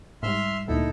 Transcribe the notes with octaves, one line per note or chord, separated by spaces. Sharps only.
G#2 G3 E5 C6 F6
D2 A#2 D#4 E4 A4